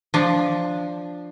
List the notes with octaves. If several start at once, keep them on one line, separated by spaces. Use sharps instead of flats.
F3 D4